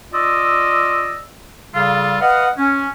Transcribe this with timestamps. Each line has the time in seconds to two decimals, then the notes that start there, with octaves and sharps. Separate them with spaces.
0.13 F4 D5 D#5 E6
1.74 C#3 G3 F4 A4 F5
2.20 B4 D#5 F5 F#5
2.58 C#4